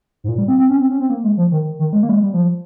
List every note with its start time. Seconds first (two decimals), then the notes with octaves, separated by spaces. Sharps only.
0.24 G#2
0.28 A#2
0.38 G3
0.48 C4
0.59 C4
0.69 C#4
0.80 C4
0.90 C#4
1.00 C4
1.10 A#3
1.24 G#3
1.37 F3
1.52 D#3
1.79 D#3
1.93 G#3
2.03 A#3
2.09 G3
2.13 G#3
2.23 G3
2.34 F3